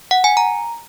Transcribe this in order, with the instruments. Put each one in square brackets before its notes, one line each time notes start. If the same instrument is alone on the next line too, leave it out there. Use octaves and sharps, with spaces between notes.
[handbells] F#5
G#5
A#5